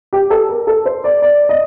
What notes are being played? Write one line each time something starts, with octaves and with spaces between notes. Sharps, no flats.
G4
A4
A#4
A4
C5
D5
D5
D#5